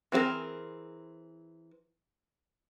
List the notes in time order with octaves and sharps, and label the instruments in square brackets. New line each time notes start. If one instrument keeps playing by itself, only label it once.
[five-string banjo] E3 C4 F#4 G#4 A#4